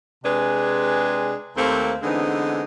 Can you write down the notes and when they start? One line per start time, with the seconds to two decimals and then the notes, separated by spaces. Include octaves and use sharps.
0.24 C3 G#3 D4 G#4 B4
1.57 D#2 A3 A#3 C4
2.03 D3 E3 G#3 B3 C4 D#4